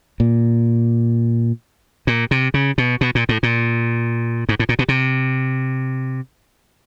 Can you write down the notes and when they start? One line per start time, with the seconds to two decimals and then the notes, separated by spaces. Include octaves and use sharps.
0.20 A#2
2.07 A#2
2.31 C3
2.54 C#3
2.78 B2
3.01 B2
3.15 A#2
3.29 A2
3.43 A#2
4.49 G#2
4.59 A2
4.69 A#2
4.79 B2
4.88 C3